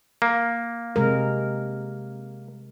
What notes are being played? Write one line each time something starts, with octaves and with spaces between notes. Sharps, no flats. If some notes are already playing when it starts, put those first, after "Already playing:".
A#3
C3 G#3 A#4